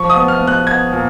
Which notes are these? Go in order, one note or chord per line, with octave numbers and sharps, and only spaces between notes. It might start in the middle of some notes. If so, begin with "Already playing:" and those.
Already playing: F3 C#6
D#6
B3
F6
B3
F#6
B3 G#6
A#2